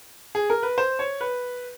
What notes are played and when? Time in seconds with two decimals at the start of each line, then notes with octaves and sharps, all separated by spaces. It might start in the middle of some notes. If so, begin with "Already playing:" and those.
0.35 G#4
0.50 A#4
0.63 B4
0.78 C5
0.99 C#5
1.21 B4